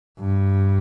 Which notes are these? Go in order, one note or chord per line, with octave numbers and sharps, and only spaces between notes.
G2